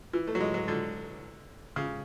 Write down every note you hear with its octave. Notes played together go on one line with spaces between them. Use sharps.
E3
A3
F#3
G#3
F#3
D3
C#3